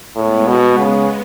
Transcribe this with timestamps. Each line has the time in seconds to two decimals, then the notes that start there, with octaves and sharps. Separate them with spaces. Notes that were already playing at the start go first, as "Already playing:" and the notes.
0.16 A2 G#3 B3
0.47 B2
0.79 C#3